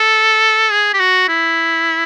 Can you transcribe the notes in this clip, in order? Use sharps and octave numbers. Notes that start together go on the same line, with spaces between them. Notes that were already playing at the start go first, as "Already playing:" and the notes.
Already playing: A4
G#4
G4
F#4
E4